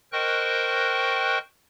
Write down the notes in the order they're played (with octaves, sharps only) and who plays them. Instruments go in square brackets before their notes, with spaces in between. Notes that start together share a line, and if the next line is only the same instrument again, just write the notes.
[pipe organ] A#4 C5 D#5 G5 C#6 F#6